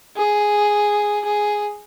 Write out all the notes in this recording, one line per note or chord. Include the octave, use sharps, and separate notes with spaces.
G#4
G#4